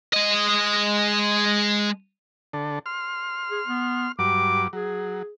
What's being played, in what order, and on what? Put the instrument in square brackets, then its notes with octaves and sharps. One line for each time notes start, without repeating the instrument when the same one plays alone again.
[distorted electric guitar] G#3 D#5
[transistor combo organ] D3 A4
C6 F6
[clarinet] G#4
B3
[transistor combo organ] G2 F#3 [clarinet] D6
[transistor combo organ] F#3 [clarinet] G#4